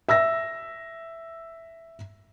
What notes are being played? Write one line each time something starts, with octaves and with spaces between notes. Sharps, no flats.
E5 E6 A#6